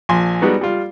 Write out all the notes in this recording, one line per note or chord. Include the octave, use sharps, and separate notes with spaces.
A#1 G#5 C6
G3 G#3 B3 D#4 F#4 B4
G3 F4